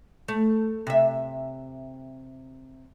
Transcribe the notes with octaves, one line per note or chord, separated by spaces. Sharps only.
A3
C3 E5